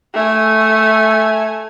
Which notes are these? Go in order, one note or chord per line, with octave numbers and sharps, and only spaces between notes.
A3 G#5